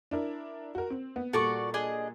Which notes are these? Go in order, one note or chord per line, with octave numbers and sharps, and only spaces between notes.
D4 E4 A#4
F#4 A#4
C4
B3
A#2 G3 F#4 A4 D5 C#6
D4 G#4 D#5